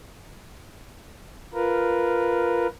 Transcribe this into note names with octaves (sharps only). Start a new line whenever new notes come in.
F4 A#4 B4